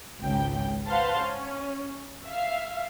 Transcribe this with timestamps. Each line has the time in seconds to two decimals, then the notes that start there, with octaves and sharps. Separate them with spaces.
0.20 G#1 C#2 G5
0.87 B4 C5 F5 F#5 A5 C6
1.19 C#4
2.26 E5 F5